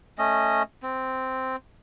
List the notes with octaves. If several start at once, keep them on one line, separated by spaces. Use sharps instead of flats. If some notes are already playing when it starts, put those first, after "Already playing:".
A3 C#4 D#5
C4